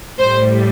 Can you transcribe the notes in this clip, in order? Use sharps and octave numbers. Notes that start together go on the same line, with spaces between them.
A2 G3 C5